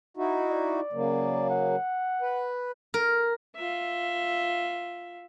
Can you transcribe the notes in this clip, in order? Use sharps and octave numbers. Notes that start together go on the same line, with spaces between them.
D#4 E4 F#4
D5
C#3 F#3 A#3
F#5
B4
A#4
F4 E5